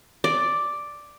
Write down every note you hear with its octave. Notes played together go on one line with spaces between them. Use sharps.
D5